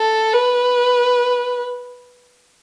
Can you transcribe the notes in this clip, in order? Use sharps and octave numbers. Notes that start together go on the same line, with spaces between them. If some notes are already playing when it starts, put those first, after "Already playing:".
Already playing: A4
B4